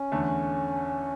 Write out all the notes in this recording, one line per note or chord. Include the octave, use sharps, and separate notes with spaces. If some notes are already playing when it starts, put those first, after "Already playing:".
Already playing: C#4
E2 D3 A3